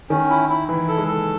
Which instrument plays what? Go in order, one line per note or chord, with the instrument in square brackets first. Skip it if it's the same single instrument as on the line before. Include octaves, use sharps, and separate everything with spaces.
[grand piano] D#3 [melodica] C#4
[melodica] E4
E4
[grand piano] E3 [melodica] E4
[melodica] A4
[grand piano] G#3
[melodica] A4